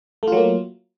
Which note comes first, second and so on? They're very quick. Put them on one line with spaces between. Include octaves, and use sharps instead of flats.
A3 F4 F#3 A#3